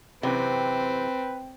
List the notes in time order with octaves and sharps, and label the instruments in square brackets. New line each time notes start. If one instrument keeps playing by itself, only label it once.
[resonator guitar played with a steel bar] F#2 C3 E3 [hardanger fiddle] C4 [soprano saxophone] B4 [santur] G5